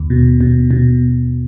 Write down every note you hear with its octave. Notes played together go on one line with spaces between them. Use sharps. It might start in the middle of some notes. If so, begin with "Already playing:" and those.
Already playing: D#2
B2
B2
B2